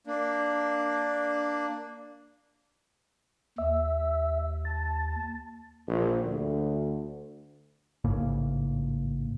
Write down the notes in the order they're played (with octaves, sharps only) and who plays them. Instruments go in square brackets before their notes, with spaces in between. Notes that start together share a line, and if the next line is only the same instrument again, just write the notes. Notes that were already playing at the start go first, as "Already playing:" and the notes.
[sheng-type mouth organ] A#3 D4
[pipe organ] D#2 [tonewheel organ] E5
[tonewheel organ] A5
[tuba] A#1
D2
[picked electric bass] A1 G#2 C#3 A#3